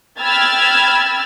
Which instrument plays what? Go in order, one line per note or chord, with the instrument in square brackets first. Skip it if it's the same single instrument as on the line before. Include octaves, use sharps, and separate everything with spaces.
[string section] G5 B5 E6 F6 G#6 A6